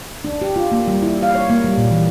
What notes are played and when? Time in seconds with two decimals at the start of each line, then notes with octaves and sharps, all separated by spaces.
0.25 D4
0.42 G4
0.56 F4
0.72 A#3
0.88 G3
1.02 E4
1.23 F5
1.35 C#5
1.50 A#3
1.64 G3
1.77 A#2
1.91 E3